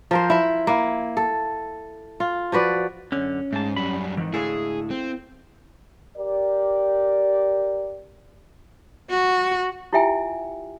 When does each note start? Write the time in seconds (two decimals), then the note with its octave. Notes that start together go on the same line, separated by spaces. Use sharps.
0.11 F3 A#4 C5
0.30 E4 E5
0.67 A#3 E4
1.17 A4
2.20 F4
2.52 F3 F#4 B4 D5
3.12 F#2 D3 C#4
3.53 G#2 A3 A5
3.76 F#2 G3 B5
4.17 F2 G#2 D#3 E3
4.34 D2 A2 G#3 E4 G#4 A4 F5
4.91 C4
6.17 G4 A#4 D5
9.10 F#4
9.93 E4 F4 G4 E5 G5 G#5